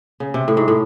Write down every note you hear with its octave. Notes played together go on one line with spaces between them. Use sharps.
C#3
C3
A2
G#2
A2